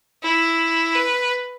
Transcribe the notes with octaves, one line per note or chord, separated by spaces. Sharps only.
E4
B4